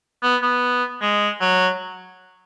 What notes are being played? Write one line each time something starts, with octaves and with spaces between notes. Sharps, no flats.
B3
B3
G#3
F#3